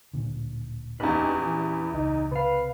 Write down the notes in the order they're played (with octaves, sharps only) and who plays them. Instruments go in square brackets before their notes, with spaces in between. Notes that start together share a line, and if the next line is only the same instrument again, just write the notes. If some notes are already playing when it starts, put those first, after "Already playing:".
[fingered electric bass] D1 A#2 D3
[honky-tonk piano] A#1 E2 [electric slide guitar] C#4 G4 B4 [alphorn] D#4
[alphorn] E3
[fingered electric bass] C#2 [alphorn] D#4
[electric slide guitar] C3 F5 [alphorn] B4